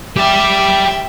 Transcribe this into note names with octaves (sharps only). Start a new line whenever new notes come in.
G4 D5 E5 G5